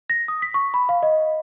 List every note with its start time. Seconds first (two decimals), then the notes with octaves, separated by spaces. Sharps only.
0.10 A#6
0.28 D#6
0.42 B6
0.54 C#6
0.74 B5
0.89 F5
1.03 D#5